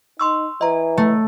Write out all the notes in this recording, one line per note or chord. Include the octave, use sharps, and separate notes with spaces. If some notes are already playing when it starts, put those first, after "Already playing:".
D#4 C6 C#6 E6
E3 D#5 A#5
A3